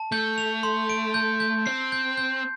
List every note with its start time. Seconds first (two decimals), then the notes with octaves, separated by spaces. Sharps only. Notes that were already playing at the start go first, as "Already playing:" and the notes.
Already playing: A5
0.12 A3 G6
0.38 F7
0.63 C6
0.90 D7
1.14 G6
1.40 G6
1.66 C4 C7
1.92 G6
2.17 G6